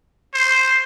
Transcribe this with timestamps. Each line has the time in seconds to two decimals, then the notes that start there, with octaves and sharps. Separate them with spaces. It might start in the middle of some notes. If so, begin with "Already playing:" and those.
0.34 C5